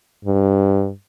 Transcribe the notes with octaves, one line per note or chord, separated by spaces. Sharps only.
G2